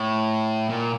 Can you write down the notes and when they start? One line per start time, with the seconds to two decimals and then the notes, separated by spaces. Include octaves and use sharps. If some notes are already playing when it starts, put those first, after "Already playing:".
Already playing: A2
0.69 A#2